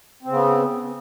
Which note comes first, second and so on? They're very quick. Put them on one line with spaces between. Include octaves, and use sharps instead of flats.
C4 C#3 B3